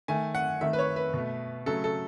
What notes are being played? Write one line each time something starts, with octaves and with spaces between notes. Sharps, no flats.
D#3 A3 G#5
F#5
D#3 A3 E5
B4
C#5
B4
B2 A3
C#3 F#3 A3 A4
A4